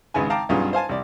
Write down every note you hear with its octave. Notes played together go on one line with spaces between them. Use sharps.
G#1 C#3 G#3 B4 G#5
F5 G5 A5 A#5 D6
B1 G2 C#4 F4 G#4
C5 F5 G#5 A5
C2 D5